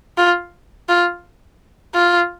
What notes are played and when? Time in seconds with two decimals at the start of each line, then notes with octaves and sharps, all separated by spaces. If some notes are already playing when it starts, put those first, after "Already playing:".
0.18 F4
0.89 F4
1.95 F4